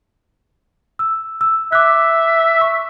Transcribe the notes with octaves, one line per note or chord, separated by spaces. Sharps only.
E6
E6
E5 D6 F#6
C#6